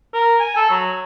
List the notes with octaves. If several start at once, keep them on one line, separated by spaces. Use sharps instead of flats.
A#4
G#5
A4
F#3